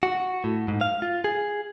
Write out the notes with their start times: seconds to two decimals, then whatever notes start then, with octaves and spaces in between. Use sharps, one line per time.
0.03 F#4
0.44 A2
0.68 G#2
0.81 F5
1.02 F4
1.24 G#4